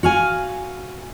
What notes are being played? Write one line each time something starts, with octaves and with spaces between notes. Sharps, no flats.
F#4 F5 G#5